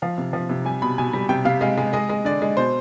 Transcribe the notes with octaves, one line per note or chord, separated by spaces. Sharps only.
F3 F5
C3
F3
C3
G3 G#5
B2 B5
B2 G#5
G3
C3 G5
C3 F5
G#3 F5
G#3
G#3 D#5
G#3
D3 D5
G#3
B2 C5